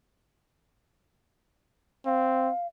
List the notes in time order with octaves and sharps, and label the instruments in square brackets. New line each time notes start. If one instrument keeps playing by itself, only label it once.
[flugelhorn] C4 [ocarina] F5